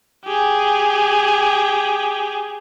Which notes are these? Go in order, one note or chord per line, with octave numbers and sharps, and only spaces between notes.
G4 G#4